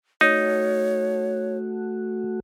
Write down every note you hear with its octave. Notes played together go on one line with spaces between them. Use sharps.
A3 D#4 F#4 C#5